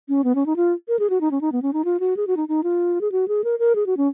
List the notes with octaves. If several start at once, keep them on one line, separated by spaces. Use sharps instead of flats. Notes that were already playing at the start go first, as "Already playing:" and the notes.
C#4
B3
C#4
D#4
F4
A#4
G#4
F#4
D#4
C#4
D#4
B3
C#4
D#4
F4
F#4
G#4
F#4
D#4
D#4
F4
G#4
F#4
G#4
A#4
A#4
G#4
F#4
C#4